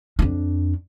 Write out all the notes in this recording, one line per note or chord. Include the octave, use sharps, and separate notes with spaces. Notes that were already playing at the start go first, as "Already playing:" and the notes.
F2 D4